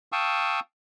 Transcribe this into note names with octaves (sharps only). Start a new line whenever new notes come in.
F5 G5 A5 C#6 D#6 E6